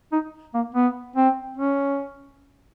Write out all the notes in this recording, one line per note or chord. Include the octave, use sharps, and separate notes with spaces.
D#4
A#3
B3
C4
C#4